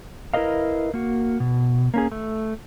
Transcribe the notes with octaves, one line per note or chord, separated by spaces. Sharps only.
E4 A#4 B4 D#5 F5
A#3 F#4
B2
A#3 C#4 G#4
A3